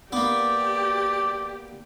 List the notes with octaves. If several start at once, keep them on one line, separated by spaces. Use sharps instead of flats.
A#3 B3 G4 D5